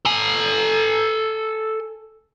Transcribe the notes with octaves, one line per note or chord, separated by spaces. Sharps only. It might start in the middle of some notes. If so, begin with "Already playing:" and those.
A4 G#5